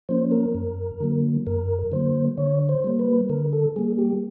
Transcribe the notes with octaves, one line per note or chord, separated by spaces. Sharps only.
F3 A#3 C#4 C5
A#4
F#2
D3 F#3 A#3
F#2 A#4
D3 F#3 A#3 C5
D3 C#5
C5
G3 A#3
B4
D3 A#4
A4
G3 A#3 G#4
G4